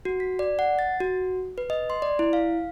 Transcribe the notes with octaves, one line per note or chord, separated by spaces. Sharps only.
F#4
B6
D5
F#5
A6
F#4
B4
D#5
C6
D5
E4
F5